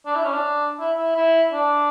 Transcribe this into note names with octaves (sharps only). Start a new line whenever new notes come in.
D4
E4
C#4
D4
E4
E4
E4
D4